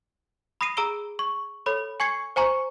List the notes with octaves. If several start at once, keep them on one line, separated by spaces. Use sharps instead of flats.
B5 D#6 A#6 C7 D#7
G#4 A#5 E6 D7 G7
C#6
A4 C#5 B5
G#5 C#6 G#6 C7 C#7
C5 G#5 A#5 C#6